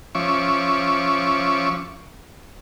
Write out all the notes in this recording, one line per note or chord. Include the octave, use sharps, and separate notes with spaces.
F3 C#4 E5 C#6 D6